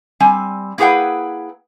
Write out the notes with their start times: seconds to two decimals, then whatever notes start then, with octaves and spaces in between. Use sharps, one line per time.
0.20 G3 C4 G#5
0.78 A#3 E4 G#4 B4 F#5 G5